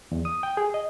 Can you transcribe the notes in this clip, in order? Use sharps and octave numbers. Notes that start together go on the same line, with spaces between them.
E2
D#6
G5
G#4
D#5